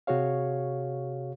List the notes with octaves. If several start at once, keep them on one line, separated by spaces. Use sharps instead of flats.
C3 F#4 G#4 C#5 F5